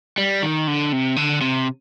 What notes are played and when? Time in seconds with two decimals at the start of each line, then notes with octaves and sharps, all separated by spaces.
0.18 G3
0.43 D#3
0.67 D3
0.92 C3
1.16 D3
1.41 C3